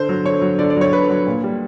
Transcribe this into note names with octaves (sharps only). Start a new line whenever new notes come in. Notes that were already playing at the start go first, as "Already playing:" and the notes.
Already playing: D3 C5
F#3
D3 C#5
F#3
D3 D5
D5
F#3 C#5
D3 B4
F#3
A#2
G3